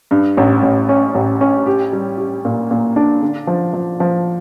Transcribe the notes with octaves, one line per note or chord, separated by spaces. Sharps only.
G2
A1
A1
C#4
A1
C#4
G4
G3
G4
A#2
A#2
D4
D3
F3
F3
F3